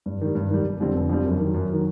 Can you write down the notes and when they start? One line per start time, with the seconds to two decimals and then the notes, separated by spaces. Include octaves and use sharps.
0.06 G2
0.21 D#3 G3
0.35 G2
0.50 D#3 G3
0.65 F1
0.80 F2 D3 G3 C4
0.94 F1
1.09 F2 D3 G3 C4
1.25 F#2
1.40 D#3 F#3
1.54 F#2
1.69 D#3 F#3